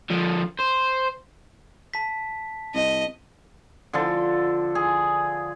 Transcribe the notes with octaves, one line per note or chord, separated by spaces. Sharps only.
D3 F3
C5
A5 B6
C2 D#5
D3 F3 A4
G#4